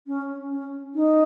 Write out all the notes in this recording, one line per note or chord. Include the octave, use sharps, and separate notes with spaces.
C#4
C#4
D#4